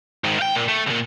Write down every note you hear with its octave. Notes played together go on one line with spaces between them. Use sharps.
G#2 D#3
F5 G5
A#2
A3
B1 A#2